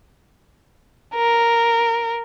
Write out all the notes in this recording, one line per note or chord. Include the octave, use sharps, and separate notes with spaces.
A#4